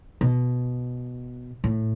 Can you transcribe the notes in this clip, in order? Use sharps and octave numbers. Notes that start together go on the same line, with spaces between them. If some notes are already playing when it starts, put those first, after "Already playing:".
B2
A2